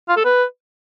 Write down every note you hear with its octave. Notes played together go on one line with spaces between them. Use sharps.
F4
A4
B4